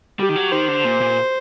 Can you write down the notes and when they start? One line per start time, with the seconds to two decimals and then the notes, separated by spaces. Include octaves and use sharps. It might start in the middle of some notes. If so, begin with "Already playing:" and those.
0.20 G3 G4
0.29 D#3
0.36 F#3
0.52 D#3 C5
0.68 D3
0.84 A#2
1.00 A#2